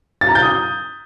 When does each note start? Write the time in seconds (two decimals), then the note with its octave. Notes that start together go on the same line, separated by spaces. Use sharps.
0.21 A6
0.28 A#5
0.35 G6
0.42 D#6